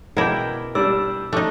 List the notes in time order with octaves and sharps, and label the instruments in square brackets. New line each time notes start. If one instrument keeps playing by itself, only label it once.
[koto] B2 E4 [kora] A#4 D5 G5
[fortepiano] G3 D4 [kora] D5 [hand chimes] E6
[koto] A3 D#4 [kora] D4